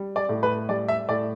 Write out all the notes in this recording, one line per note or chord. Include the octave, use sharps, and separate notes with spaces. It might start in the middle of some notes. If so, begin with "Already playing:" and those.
Already playing: G3
D5
A2
B4
G3 D5
E5
A2 D5